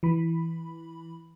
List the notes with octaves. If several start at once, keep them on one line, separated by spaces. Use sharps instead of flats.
E3 B5